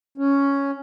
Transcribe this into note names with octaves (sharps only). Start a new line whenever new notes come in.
C#4